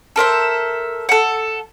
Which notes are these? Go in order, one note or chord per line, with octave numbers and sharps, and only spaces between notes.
A4 A#4 C5 E5
A4 F#5